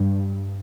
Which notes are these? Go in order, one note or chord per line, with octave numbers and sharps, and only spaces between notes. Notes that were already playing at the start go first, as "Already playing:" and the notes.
Already playing: G2